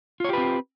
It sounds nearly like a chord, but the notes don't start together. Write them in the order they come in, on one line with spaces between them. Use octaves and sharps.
F4 C#5 G4 B4 C4